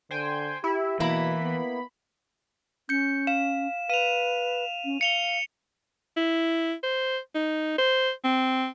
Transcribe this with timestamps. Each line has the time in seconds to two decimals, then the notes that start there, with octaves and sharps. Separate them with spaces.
0.11 D3 C5 G5 G#5
0.64 E4 G4
1.00 B2 E3 A#3 E4 B5
1.42 B3
2.89 C#4 G6 C#7
3.27 F5 E7
3.90 B4 F5 D#7 F7
4.85 C#4
5.01 F5 C#7 F7 G7
6.17 E4
6.83 C5
7.35 D#4
7.78 C5
8.25 C4